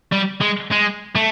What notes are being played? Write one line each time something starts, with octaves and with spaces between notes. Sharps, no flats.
G3
G#3
G#3
A3